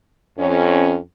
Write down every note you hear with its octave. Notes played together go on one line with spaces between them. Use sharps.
F2 C#4